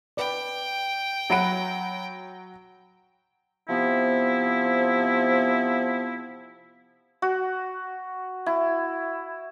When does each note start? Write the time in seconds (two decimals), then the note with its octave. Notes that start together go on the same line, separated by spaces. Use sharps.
0.17 B4 D5 G5
1.30 F#3 E5 F#5 B5 D7
3.69 C3 F3 B3 E4
7.22 F#4
8.46 E4